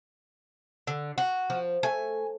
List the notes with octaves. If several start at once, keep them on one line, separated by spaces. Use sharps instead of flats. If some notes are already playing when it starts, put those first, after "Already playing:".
D3
F#4
F3
A3 G#5